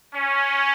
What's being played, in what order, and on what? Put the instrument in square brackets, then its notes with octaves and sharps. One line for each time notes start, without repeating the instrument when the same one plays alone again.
[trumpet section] C#4